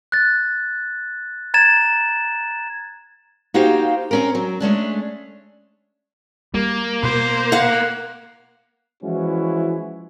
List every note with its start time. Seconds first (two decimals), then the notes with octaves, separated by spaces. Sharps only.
0.12 F#6 A6
1.54 A#5 G#6 A6 E7
3.54 A#3 D#4 F#4 G4 C5 F5
4.11 C4 C#4 A#4
4.35 F#3
4.60 G#3 A3 C#4 D4
6.54 G3 A#3
7.03 B2 C5
7.52 F5 F#5
9.04 E3 F3 G#3 C#4 E4 F#4